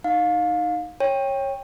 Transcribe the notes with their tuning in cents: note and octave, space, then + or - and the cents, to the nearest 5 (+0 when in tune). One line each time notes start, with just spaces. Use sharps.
D#4 +0 F5 +25
C#5 -15 G5 +15